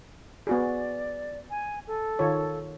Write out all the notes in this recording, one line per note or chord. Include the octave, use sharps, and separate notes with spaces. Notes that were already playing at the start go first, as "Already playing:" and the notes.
B3 F#4 G#4 D5
G#5
A4
D#3 F4 C#5